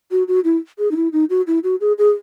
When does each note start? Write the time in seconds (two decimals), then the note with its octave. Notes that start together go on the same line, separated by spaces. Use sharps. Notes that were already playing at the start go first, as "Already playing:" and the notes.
0.11 F#4
0.28 F#4
0.44 E4
0.78 G#4
0.91 D#4
0.96 E4
1.13 D#4
1.30 F#4
1.47 E4
1.64 F#4
1.81 G#4
1.98 G#4